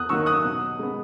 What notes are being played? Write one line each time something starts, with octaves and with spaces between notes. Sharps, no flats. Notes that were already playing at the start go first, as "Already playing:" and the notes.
Already playing: E2 D#6 F#6
D#3 F#3 A#3 C#6 E6
D#6 F#6
B2
G#3 B3